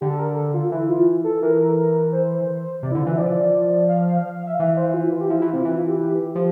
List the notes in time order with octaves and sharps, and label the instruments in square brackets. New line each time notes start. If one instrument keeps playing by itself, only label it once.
[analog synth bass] D3 [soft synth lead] G4
[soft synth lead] A4
A#4
A4
F4
[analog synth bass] E3 [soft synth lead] E4
[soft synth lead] F4
A4
[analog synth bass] E3 [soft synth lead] A#4
[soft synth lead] C5
[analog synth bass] C3 [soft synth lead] D5
[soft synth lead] E4
[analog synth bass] D3
[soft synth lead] F4
[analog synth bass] E3 [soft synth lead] E5
[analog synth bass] F3 [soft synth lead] D5
[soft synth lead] F5
F5
F5
F5
E5
F5
[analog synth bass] E3 [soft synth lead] E5
[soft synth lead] C5
F4
E4
F4
G4
[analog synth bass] F3 [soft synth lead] E4
[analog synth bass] E3
[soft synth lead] F4
[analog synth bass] C3
[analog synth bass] E3 [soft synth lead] E4
[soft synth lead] F4
G4
G4
[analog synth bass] F3